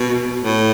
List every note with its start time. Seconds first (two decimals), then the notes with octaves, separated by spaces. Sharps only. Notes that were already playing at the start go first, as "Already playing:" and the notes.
Already playing: B2
0.41 A2